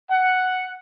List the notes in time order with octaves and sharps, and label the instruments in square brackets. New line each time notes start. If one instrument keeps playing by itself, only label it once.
[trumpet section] F#5